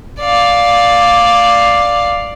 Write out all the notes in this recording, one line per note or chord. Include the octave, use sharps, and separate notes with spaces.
D5 F5